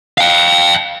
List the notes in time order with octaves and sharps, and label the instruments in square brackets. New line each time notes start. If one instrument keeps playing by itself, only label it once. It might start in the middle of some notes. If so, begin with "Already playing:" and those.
[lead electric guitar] F5 G5